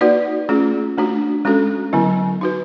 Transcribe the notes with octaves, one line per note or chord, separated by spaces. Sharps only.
A#3 D#4 F#4 B4 D5
A3 C#4 F4 G#4
A3 D4 F#4
G#3 C#4 F#4 A4
D3 F#3 B3 E4
D#4 F#4 B4